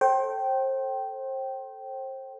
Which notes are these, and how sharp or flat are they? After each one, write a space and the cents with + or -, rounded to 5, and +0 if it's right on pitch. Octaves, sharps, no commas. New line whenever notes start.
A4 +5 C5 +30 G5 -15